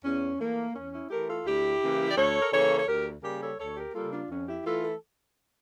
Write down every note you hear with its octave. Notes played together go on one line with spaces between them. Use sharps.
E2 C#4
E3 A3 A#3
E2 C#4
C#4 E4
E3 A3 G4 A#4
F4 A4
D2 E4 G4
C#3 E3 A#3
D5
D2 A4 C#5
A#4
C#3 E3 A#3 A4 C#5
C#5
D2 G4 A#4
C#3 G3 A#3 G4 A#4
A4 C#5
D2 A4 C#5
G4 A#4
C#3 G3 A#3 F4 A4
D4 F4
F2 C#4
E4 G4
E3 A3 F4 A4
A4